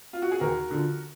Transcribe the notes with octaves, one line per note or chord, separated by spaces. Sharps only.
F4
F#4
G#4
D#2 F#4 A#4
D3 F3